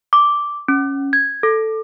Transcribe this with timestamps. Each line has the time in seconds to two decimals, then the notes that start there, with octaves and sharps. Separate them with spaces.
0.13 D6
0.68 C#4
1.13 G#6
1.43 A4